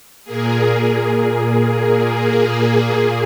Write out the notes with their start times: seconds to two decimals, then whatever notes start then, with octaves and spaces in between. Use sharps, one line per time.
0.24 A#2 A#3 G#4